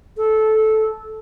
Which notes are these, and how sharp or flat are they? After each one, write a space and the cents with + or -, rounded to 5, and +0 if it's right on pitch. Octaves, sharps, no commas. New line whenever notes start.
A4 -15